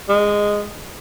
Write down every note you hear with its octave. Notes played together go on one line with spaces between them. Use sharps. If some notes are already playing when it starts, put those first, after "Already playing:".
G#3